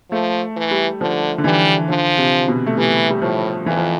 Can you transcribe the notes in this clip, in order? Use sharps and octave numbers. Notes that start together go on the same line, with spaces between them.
F3 A3
E3
G3
D3 F3
D3
E3 G3
D3 F3
C3
B2
A3
E3 G3
G3
A2 F3
F2 E3
F3